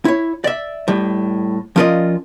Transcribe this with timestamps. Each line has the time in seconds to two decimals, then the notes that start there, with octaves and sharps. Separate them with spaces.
0.05 E4 C#5
0.44 D5 E5
0.88 A2 G3
1.76 F3 C#4 F4 A#4 D5 D#5